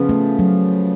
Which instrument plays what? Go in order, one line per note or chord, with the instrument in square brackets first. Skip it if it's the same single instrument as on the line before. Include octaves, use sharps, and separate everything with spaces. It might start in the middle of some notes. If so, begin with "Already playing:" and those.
Already playing: [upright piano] C#3 F3 B3
[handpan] A3
F#3